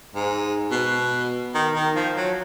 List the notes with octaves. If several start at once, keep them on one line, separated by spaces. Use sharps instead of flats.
G#2
B2
D#3
D#3
F3
F#3